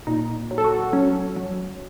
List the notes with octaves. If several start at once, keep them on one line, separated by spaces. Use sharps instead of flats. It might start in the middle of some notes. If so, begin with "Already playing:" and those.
A#2 D#4
F#3
A4
F#4
F#3 C#4
F#3